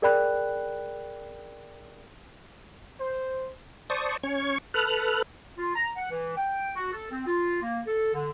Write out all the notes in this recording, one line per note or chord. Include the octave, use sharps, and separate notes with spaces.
G#4 A#4 D5 G5 B5 F#6
C5
C5 D5 A5 C#6 D#6
C#4 C#5 C#6
A4 B4 F6 F#6
F4
A#5
F#5
E3
G5
F#4
A4
C4
F4
A#3
A4
D3